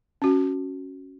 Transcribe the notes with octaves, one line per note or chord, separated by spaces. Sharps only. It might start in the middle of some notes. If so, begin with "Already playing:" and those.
C#4 F#4